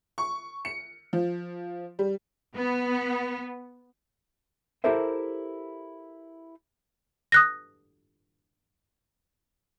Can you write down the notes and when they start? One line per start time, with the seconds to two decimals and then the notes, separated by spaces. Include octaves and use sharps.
0.18 C#6
0.65 C#7
1.13 F3
1.99 G3
2.55 B3
4.84 E4 G4 A4 A#4 C5 E5
7.32 D#6 F#6 A#6